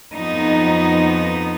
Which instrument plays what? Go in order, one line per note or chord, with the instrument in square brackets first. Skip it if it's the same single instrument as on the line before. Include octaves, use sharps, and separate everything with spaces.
[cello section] F2 F3 B3 D#4